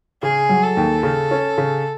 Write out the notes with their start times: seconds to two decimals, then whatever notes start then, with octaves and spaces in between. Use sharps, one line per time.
0.22 C#3 G#4
0.49 F#3
0.63 A4
0.77 D#2
1.03 C#3
1.31 C#4
1.58 C#3